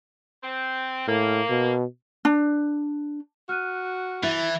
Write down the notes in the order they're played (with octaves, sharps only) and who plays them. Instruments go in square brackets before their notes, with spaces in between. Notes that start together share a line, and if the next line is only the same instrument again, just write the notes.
[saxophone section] C4
[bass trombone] A2 [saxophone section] A#3
[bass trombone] B2
[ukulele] D4
[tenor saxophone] F#4 [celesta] F6 F#6 D#7
[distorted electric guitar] E3 [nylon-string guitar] E4 [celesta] A6